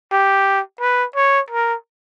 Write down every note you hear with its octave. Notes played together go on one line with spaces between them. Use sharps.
G4
B4
C#5
A#4